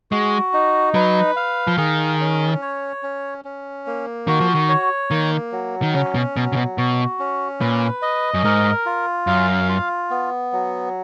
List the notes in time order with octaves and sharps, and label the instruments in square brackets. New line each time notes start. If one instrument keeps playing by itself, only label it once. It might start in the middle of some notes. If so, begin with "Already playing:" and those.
[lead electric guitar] G#3 [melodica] F#4
[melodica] D#4
[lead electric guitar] F#3 [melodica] B4
[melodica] F5
[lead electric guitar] F3
[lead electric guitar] D#3 [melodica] G#4
[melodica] C#4
C#5
C#4
C#4
A#3
[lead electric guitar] D#3 [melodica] F#4
[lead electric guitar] F3
D#3
[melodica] C#5
[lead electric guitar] D#3 [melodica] A#3
[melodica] F#3
[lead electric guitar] D#3
[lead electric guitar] C#3 [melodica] C#4
[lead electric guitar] B2
[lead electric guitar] B2 [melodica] F#3
[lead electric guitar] C#3
B2
[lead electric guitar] B2 [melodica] F#4
[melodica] C#4
[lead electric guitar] A#2 [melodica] B4
[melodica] D#5
[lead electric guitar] F#2
[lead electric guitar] G#2 [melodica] A#4
[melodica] F4
[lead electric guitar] F#2 [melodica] F5
[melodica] F4
B3
F#3